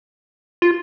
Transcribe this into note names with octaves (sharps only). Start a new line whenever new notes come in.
F4